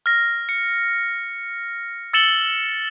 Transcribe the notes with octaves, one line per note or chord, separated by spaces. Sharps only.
F6 A#6
C#7
E6 A6 C#7 E7 F#7 G7